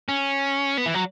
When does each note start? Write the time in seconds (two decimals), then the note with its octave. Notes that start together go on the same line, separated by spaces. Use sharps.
0.09 C#4
0.77 B3
0.86 E3
0.94 F#3